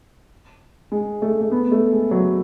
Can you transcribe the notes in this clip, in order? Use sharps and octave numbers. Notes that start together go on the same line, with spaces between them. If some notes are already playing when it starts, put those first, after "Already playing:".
G#3
A3
A3
B3
A3
G#3
F#3